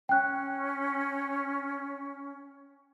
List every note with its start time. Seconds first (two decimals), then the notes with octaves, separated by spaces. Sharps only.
0.09 C#4 G5 F#6